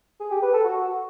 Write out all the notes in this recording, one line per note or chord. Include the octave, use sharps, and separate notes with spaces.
G#4
G4
B4
A4
F#4